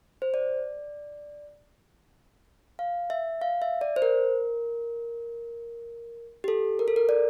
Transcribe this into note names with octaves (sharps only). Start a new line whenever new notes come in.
C5
D5
F5
E5
F5
E5
D5
C5
A#4
G4
A4
A#4
A4
A#4
D5